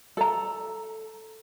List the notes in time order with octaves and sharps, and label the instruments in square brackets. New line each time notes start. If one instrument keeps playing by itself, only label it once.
[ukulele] A4 A#5